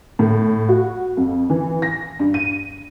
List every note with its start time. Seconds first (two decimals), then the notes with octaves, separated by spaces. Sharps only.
0.19 A2
0.69 F#4
1.17 F2
1.50 E3
1.82 A#6
2.19 G2
2.34 D#7